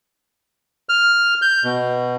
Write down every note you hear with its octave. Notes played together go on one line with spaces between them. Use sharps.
F6
G6
B2